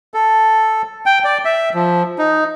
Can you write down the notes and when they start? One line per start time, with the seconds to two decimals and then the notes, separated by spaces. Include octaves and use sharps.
0.14 A4
1.06 G5
1.24 D5
1.45 E5
1.74 F3
2.18 D#4